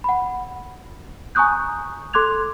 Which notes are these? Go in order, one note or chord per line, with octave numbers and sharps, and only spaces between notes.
F#5 B5
G#5 A#5 C#6 D#6 F#6 G6
A4 C6 D6 F#6 G#6 F7